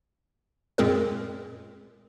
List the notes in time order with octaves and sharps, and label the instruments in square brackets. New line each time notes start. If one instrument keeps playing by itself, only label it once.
[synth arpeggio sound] F#2 A#2 G#3 C4 G#4 A#4